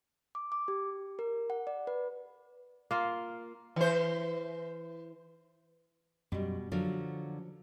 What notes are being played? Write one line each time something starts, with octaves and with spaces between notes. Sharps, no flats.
D6
D6
G4
A#4
F#5
D5
B4
A#3 F4
E3 C5
F#2 B2 G3
D3 F3 F#3 F4